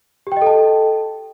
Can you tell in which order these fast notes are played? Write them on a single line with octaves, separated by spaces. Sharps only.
G4 G5 D#5 A4 A5